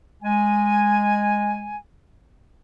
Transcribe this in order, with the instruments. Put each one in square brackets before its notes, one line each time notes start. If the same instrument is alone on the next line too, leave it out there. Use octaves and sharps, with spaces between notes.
[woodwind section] G#3 G#5